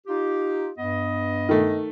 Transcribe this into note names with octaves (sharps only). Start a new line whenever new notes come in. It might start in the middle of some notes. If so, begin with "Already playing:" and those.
D#4 F4 G4
G2 B3 D#5
D#3 A3